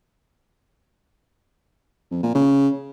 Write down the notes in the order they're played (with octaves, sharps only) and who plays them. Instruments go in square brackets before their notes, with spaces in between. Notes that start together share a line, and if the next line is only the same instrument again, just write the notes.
[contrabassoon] F2
A#2
C#3